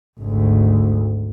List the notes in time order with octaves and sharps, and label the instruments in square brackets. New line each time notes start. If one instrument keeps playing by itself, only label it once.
[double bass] G#1 D2